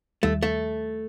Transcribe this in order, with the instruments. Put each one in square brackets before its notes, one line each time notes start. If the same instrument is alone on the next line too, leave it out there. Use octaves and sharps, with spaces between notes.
[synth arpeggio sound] D#2 D#3 G3 [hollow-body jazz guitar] A3
[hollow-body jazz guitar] A3